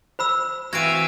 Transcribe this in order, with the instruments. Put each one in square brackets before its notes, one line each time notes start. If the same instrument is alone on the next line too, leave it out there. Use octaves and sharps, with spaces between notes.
[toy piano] C5 B5 E6
[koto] E3 C4 F#4 [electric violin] E5 F5 [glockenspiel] G#6 D7 D#7